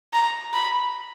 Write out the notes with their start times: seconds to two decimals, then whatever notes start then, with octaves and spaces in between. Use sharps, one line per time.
0.13 A#5
0.53 B5